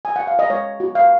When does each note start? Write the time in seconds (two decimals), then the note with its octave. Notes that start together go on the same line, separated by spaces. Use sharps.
0.05 G#5
0.16 F#5
0.27 F5
0.39 D#5
0.50 G#3 C#5
0.80 F#4
0.95 F5